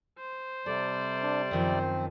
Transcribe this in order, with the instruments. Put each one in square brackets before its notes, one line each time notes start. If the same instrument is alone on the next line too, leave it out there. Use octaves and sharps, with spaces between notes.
[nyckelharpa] C5
[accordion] C3 G3 D5 [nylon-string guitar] A4
[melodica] D4
[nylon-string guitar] F#2 D#3 F3 [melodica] C4